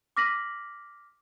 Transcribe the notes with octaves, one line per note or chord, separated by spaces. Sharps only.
D6 F6 A#6 B6 D#7 F#7